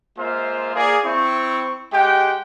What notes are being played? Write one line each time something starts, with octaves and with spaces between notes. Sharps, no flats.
G#3 A#3 F4 C5 E5 F5
A#3 G#4 D5
C4 E4 C#6
G#3 G4 F#5 G5